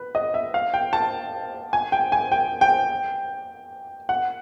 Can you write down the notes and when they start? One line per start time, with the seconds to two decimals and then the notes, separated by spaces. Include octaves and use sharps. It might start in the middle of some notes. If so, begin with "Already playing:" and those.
Already playing: B4
0.15 D#5
0.34 E5
0.54 F5
0.74 G5
0.93 A5
1.73 G#5
1.92 G5
2.12 G#5
2.32 G5
2.61 G5
4.09 F#5